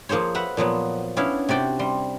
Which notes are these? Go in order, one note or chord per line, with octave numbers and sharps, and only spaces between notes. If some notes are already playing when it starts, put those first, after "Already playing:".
F3 A#3 G#4 C5 C#5
B4 E5 F#5 A#5
A#2 F3 F#3 B3
B3 C#4 D4 E4 F5
C3 F#4 D5 G5
G3 C6